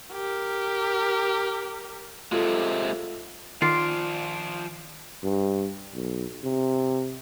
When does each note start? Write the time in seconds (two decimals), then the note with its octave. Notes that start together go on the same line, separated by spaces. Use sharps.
0.12 G4 A#4
2.32 C3 G#3 F4 A4
3.62 D#3 F3 F4 D5 C7
5.23 G2
5.94 B1
6.44 C3